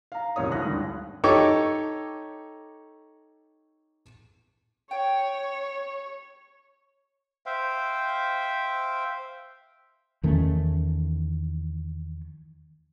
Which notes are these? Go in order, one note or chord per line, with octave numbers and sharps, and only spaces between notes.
F5 A#5
C2 F#2 A#2 C#5 D#6
D2 G#2 E4 D#6 F#6 A#6
G#1 D#2 D3 G3
D#4 G4 A4 C#5 C#6 D6
C#5 G5
C5 E5 F5 G5
E2 D#3 A3 C#4